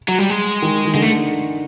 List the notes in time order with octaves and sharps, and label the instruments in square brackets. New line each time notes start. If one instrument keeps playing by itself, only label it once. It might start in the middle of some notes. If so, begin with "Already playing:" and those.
[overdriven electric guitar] F#3
G3
G#3
[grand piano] D#3
D#3
[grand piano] D3 [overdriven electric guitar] G#3
[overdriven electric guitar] A3